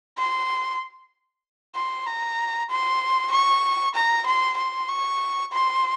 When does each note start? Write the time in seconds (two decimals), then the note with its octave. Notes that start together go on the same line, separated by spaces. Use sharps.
0.18 C6
1.75 C6
2.06 A#5
2.70 C6
3.32 C#6
3.95 A#5
4.26 C6
4.57 C6
4.89 C#6
5.52 C6